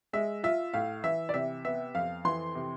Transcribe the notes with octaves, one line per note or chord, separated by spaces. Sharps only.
G#3 E5
F4 E5
A2 F5
E3 E5
D5
C3 E5
B3 E5
F2 F5
E3 C6
C3